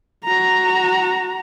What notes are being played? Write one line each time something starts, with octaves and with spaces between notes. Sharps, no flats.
F#4 A#5